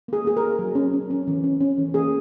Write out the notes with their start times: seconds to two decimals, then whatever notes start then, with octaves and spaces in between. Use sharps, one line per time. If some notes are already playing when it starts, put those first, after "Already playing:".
0.08 A#3 G#4
0.25 A#3 G#4
0.37 A#4
0.42 A#3
0.59 F#3
0.75 C#4
0.93 C#4
1.10 C#4
1.27 E3
1.44 C#4
1.61 C#4
1.78 E3
1.94 A#3 G#4